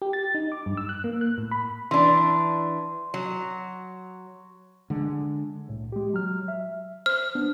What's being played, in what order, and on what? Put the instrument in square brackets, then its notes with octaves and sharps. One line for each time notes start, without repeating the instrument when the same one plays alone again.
[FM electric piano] G4
A6
D#4
D6
G2
E6
F#6
A#3
F#6
A2
B5
[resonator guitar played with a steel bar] E3 D4 [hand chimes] C6
[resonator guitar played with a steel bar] F#3
[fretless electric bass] D3 G#3
[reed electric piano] C2 A2
G#3 G4
F#3 F6
E5
[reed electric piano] C5 [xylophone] F6
[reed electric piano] B3 D4